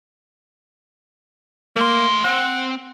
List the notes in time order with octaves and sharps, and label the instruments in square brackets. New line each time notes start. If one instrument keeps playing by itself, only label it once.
[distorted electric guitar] A3 C6 [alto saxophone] A#3
[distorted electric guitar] C4 [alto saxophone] F#5